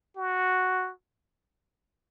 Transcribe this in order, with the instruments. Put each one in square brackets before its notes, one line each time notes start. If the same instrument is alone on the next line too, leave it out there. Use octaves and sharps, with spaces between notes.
[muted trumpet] F#4